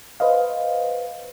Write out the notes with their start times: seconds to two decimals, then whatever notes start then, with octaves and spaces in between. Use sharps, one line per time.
0.20 B4 C5 D#5 F5